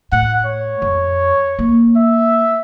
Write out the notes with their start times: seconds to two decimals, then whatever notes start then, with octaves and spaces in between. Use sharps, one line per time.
0.12 A2 F#5
0.46 C#5
0.82 F2
1.59 A#3
1.96 E5